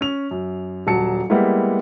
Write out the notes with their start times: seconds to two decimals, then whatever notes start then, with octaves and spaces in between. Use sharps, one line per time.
0.01 C#4 F7
0.31 F#2
0.87 D#1 F#3 A5 C#7
1.30 G3 G#3 A#3 B3 E4